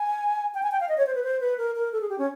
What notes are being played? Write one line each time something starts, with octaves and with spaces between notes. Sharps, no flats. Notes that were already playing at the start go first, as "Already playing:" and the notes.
Already playing: G#5
G5
G#5
G5
F5
D#5
C#5
C5
B4
C5
B4
A#4
A#4
A4
G#4
G4
C#4